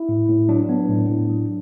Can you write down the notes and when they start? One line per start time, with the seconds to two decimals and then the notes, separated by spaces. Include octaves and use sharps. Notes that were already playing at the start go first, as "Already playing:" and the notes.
Already playing: E4
0.09 A2
0.29 A2
0.49 F#3 D4
0.69 B3
0.89 A2
1.09 A2
1.30 F#3